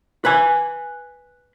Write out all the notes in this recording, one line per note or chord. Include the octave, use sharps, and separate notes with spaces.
B4 G#5